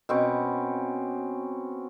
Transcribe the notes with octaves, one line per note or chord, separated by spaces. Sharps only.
B2 C4 C#4